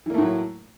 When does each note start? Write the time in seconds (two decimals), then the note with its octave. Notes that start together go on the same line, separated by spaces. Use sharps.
0.06 E3
0.10 A#3
0.14 A3
0.18 A2
0.22 F#3